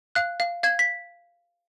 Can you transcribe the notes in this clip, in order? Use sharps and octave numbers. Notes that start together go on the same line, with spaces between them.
F5 F#6
F5
F5 G#6
B6